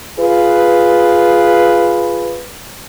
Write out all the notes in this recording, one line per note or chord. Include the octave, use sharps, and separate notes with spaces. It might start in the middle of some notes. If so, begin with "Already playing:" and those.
F4 G#4 B4